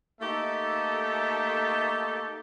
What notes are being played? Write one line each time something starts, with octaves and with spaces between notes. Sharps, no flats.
A3 A#3 D#4 G4 A4 E5